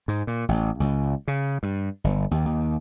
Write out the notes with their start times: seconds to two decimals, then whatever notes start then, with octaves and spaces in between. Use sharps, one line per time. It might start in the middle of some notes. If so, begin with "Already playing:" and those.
0.08 G#2
0.27 A#2
0.49 A1
0.80 C#2
1.28 C#3
1.63 G2
2.04 G1
2.31 D#2
2.46 D#2